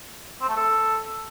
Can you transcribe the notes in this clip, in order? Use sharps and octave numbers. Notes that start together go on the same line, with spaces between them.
C4
A3
A4